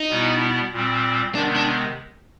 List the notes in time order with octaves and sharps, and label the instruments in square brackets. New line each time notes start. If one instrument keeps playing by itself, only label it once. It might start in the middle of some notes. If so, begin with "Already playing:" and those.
Already playing: [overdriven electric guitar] D#4
[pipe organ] B2 G3 B3 E4
A#2 G3 C4
[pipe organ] C3 D#3 G#3 B3 [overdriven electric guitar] D4
[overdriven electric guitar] D4